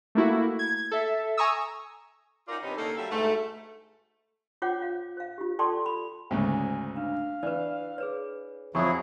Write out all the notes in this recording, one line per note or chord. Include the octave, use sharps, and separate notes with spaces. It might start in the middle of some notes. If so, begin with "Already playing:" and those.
A3 A#3 E4 F#4
G#6
A4 E5
G#5 A#5 C#6 D#6 E6
C#4 D#4 F4 F#4 A#4 D5
G2 C3 B3 C#4 D#4
D3 A#3 C#4 D#4 A4
F#3 G3 A4 E5 F5
D2 G#2 B2 A3
F4 C5 C#5 F#5 G5 D6
F5
C5 F5
F4 G4
A4 D5 G5 A5 C6 C#6
B5
D2 G#2 C#3 G#5
D4 F5
E3 B4 D5
G#4 B4 C#5
F2 F3 F#3 E4 G#4 C5 C#5 C#6